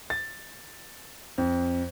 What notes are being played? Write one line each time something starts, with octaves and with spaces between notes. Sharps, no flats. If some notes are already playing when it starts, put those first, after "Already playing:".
A6
F2